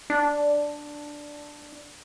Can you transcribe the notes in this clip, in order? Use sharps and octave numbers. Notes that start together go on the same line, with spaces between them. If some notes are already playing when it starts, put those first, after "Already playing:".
D4